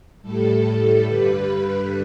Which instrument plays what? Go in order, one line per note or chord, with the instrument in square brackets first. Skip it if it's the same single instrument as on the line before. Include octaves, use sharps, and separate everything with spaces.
[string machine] A2 G3 A4
G2 D3 G3 B4